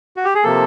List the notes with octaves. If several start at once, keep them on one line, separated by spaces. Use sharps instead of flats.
F#4
G4
G#4
C3 F3 A#3 A4